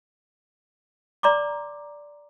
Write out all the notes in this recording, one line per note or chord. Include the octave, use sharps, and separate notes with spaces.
D5 A#5 C6 D6